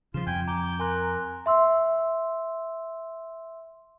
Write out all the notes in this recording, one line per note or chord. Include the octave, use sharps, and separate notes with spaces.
C#3 F3 F4 C6 E7
F2 G5 G#5 G6
A#5 D6 G6
A#4 G#5 C6 F#6
E5 C6 E6